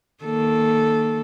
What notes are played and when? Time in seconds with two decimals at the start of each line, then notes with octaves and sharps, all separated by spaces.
0.24 D#3 A#3 A4